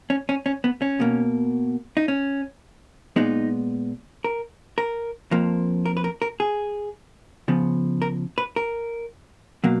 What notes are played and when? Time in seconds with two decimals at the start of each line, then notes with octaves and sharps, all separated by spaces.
0.10 C#4
0.29 C#4
0.46 C#4
0.64 B3
0.82 C#4
1.00 B2 A#3
1.97 D#4
2.08 C#4
3.16 A#2 G#3 B3 D#4
4.24 A#4
4.78 A#4
5.31 F2 F3 A#3
5.85 A#4
5.97 B4
6.04 A#4
6.22 A#4
6.40 G#4
7.48 C#3 F3 B3
8.02 A#4
8.38 B4
8.56 A#4
9.64 B2 F#3 A#3